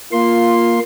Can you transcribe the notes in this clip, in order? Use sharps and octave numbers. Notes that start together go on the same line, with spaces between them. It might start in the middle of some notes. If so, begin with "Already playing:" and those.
A#3 F4 C6